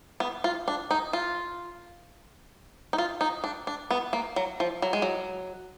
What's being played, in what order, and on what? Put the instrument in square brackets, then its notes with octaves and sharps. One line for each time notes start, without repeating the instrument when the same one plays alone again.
[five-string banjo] B3
F4
D4
D#4
F4
D#4
F4
D#4
D4
D4
B3
A#3
F#3
F3
F#3
G#3
F#3